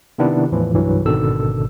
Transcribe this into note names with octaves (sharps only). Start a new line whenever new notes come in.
C3 D#3 B3 D4 E4
E2 A2 E3 F3
C2 G2 E3 F#3
G#1 B2 D3 D#3 A4 E6